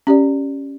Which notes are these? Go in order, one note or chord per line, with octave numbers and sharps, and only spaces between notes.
C#4 G4 D5